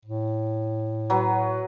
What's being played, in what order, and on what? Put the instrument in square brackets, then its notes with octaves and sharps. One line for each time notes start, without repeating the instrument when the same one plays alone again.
[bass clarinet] A2
[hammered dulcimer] F#3 B4